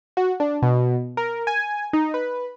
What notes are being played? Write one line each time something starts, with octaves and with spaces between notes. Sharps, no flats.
F#4
D4
B2
A#4
G#5
D#4
B4